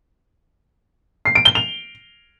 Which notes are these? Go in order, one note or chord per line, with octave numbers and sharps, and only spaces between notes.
C7
D7
G7
F7